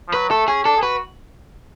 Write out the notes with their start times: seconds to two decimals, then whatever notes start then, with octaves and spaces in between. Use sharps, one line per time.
0.08 F3
0.14 F#3 B4
0.30 A3 A4
0.48 C#4 G#4
0.65 D4 A4
0.77 G#4
0.83 F#4 B4